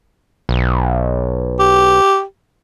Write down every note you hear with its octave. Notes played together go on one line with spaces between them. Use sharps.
B1
G4